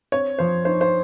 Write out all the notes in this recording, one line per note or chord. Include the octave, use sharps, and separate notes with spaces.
C4 C#5
F3 C5
D#4 C5
C5